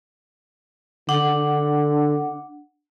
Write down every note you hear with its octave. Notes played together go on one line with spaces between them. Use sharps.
D3 D4 F#5